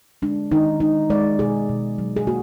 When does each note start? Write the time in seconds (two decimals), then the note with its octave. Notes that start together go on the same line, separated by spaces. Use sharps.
0.22 G#3 D4
0.52 D#3 D#4
0.80 G#3 D#4
1.10 G#3 D5
1.39 B2 G#4
1.69 B2
1.98 F#3
2.17 G#4
2.27 A#3 F#4